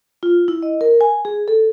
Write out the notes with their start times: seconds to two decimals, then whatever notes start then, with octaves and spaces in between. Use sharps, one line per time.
0.23 F4
0.48 E4
0.63 D#5
0.81 A#4
1.01 G#5
1.25 G#4
1.48 A4